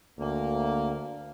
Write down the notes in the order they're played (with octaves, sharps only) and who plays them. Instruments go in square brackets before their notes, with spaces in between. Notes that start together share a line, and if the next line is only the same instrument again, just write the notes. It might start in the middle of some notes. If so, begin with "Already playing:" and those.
[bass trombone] D2 [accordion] A#3